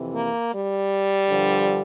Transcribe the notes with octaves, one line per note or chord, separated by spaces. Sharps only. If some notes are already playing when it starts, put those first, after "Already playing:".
Already playing: F2 C3 E3
A#3
G3
G2 D3 F3